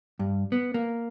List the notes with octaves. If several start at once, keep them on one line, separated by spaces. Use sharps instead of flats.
G2
B3
A#3